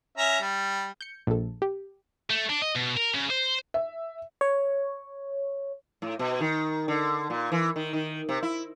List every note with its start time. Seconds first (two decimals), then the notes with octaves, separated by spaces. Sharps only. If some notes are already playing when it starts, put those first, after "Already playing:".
0.18 C#4 E5 A#5
0.41 G3
1.01 G6 C#7
1.27 A#1 A4
1.62 G4
2.30 A3
2.50 D4
2.62 D#5
2.76 B2
2.97 A#4
3.14 C#3
3.30 C5
3.74 E5
4.41 C#5
6.02 A2
6.19 B2
6.40 D#3
6.88 D3
7.30 A#2
7.52 E3
7.76 D#3
7.93 D#3
8.29 C3
8.43 E4